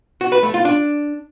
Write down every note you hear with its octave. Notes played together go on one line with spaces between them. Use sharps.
F#4
B4
A3
F4
D4